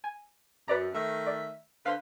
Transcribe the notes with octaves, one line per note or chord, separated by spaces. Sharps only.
G#5
F#2 B4 D5 A#5
D#3 A3 E5
D5
D3 B4 C5 F5